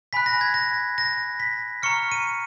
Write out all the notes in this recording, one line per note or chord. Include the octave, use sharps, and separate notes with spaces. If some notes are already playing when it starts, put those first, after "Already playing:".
G#5 B5 F#6 B6
A#6
G#6
A#6
A#6
B6
A#5 C#6 F6 C#7
D#7